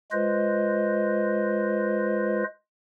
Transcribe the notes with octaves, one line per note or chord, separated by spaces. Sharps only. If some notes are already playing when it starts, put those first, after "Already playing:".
G#3 F4 B4 C5 D#5